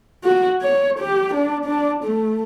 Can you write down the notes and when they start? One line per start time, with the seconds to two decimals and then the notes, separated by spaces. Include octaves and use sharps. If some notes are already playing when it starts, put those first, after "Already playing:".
0.24 F#4
0.62 C#5
0.99 G4
1.34 D4
1.65 D4
2.04 A3